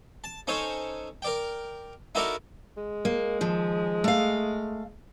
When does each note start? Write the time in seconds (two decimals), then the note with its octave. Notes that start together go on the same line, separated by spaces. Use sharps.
0.24 A5
0.47 C#4 D#4 A4 C5 C#5
1.22 A#4 D5 G5
2.15 D#4 E4 F#4 A4 A#4 D5
2.77 G#3
3.05 A#3
3.41 D#2 F3
4.04 A3 F5